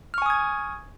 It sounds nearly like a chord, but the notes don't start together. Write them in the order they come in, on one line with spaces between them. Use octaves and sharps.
F6 C#6 G#5 D#6 G#6